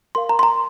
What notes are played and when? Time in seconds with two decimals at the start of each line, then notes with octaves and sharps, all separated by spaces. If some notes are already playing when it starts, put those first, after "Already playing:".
0.15 A#4 F5 C6
0.29 A#5
0.39 C6
0.43 A#5